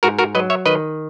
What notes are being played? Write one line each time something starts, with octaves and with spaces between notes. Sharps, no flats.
G#2 F#4 A#4
F#4 A#4
F#3 B4 D#5
C#5 E5
D#3 B4 D#5